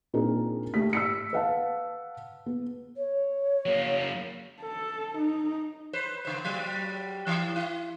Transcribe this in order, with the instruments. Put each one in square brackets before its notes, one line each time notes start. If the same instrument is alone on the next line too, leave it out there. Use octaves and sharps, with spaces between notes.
[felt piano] A#2 C4 D4 D#4 G#4 A#4
A3 G4 B6
E6 B6 C#7
B4 F5 F#5 A5
B3
[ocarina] C#5
[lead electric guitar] F#3 A#3
[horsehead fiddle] A4
D#4
[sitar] B4 C5
C#3 C5
F#3 G3
G2 E3 E4
E4